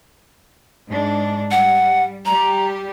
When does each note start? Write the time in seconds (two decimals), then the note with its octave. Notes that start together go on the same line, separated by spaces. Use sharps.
0.87 G#2 D4
1.51 G3 F#5
2.26 G3 G4 A#5